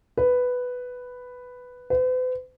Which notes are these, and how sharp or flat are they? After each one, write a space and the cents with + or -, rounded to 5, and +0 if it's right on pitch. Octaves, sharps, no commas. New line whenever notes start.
B4 +5
B4 +45